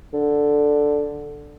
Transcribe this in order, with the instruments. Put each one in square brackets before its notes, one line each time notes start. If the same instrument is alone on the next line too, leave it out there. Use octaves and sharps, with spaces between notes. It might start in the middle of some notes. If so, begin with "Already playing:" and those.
[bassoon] D3